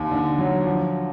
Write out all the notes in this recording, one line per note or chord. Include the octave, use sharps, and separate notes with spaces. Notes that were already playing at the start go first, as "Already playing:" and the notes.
Already playing: D#2
D3
F#3
F3